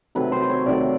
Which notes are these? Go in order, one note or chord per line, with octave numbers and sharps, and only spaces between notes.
C3 D#3 F#3 A3 B4
C5
C5
C#5
C3 D#3 F#3 A3 D5